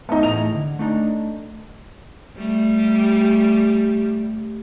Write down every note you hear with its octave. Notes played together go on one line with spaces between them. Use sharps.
A3 B3 D#4
E2 A2 D#5 F7
D3
A3 D4 D#4
G3 A3 G4